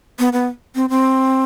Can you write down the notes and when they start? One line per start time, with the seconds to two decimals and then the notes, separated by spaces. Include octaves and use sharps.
0.19 B3
0.33 B3
0.75 C4
0.90 C4